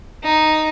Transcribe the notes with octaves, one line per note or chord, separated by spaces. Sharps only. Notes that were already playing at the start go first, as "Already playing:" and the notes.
D#4